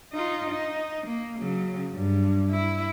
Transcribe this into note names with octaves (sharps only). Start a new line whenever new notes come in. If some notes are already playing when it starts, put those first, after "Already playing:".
D#4 F4
D#4
A#3
C#3 F#3
G2
E4